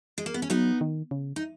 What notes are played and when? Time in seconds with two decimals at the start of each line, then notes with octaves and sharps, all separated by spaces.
0.18 G#3
0.26 A#3
0.34 B3
0.42 C#4
0.50 F#3 B3 D#4
0.81 D#3
1.11 C#3
1.36 D#4